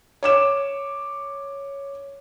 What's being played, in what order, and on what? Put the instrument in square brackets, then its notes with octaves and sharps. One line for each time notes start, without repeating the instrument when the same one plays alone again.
[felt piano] C#5 D6 E7